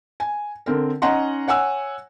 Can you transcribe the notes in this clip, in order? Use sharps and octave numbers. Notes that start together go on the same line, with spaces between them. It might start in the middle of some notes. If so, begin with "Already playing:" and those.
G#5
D3 C4 A#4
C#4 D#4 D#5 F#5 A#5 C6
C#5 F#5 G#5 E6